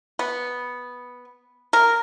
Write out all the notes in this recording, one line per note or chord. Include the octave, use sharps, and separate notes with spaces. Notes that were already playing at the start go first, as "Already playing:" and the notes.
B3
A#4